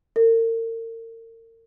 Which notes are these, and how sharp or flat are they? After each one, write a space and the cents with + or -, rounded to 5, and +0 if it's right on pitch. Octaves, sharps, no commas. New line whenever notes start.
A#4 -40